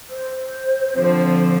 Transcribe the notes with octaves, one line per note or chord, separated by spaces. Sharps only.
C5
D3 F3 C4